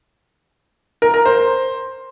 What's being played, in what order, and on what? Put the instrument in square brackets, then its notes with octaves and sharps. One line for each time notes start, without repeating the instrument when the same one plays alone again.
[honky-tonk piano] A#4
A#4
C5